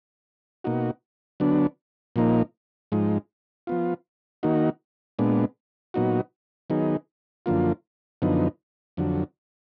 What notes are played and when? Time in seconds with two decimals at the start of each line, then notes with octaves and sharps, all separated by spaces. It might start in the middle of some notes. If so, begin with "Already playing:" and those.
0.64 B2 A#3 D#4 F#4
1.40 D3 F#3 B3 D4
2.16 A#2 F3 A#3 D#4
2.92 G#2 F3 G#3 D#4
3.67 F3 B3 F4
4.43 D#3 A#3 D#4 F#4
5.19 A#2 G#3 B3 D4
5.94 A#2 F#3 B3 D#4 F#4
6.70 D#3 F#3 B3 D#4 G#4
7.46 F#2 D3 F3 A#3 F4
8.22 F#2 D3 F3 B3 D#4
8.97 F2 D3 F#3